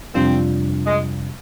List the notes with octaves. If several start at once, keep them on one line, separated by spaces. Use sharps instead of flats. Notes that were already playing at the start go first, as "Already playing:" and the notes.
F2 C3 G3 C4 D4 F4
G#3